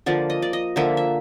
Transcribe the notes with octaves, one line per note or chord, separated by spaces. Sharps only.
D3 F3 A#3 D5
D#5
D5
D#5
D3 F3 A#3 E5
E5